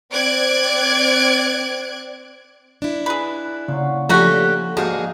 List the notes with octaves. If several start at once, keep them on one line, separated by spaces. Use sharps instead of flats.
C4 D5 F#6 G#6 D7
D4 E4
G#4 B4
A#2 C#3 F#3
F3 A3 A#3 C#4 D4 F#4 G4
G#2 A#3 D4 F#4 G#4 F5 G#5